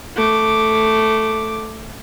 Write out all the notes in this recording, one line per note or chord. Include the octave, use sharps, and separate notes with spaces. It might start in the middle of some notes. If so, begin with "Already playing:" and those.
A3 D6